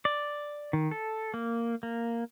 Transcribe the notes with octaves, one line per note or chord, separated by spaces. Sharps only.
D5
D#3
A4
A#3
A#3